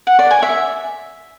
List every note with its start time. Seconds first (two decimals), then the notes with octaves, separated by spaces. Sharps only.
0.07 F#5
0.19 D5
0.31 G#5
0.43 E5